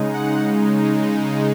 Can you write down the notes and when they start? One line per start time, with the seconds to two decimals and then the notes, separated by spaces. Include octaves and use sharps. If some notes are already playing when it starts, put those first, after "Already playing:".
Already playing: C#3 G#3 D#4
0.14 F#5